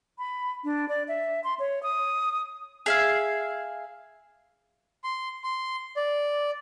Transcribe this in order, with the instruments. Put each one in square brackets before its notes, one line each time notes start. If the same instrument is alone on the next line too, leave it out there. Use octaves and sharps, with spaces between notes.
[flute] B5
D4
D5
E5
C6
C#5
D#6
[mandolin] G#4 E5 F5
[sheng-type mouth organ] C6
C6
D5